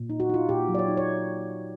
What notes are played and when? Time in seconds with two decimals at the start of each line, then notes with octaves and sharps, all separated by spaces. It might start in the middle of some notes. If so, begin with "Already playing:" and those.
Already playing: A#2
0.10 D#4
0.20 F#4
0.29 D#4 F4
0.49 A#2 G4
0.69 F#3
0.75 D5
0.79 C#5
0.88 D#4
0.97 C#5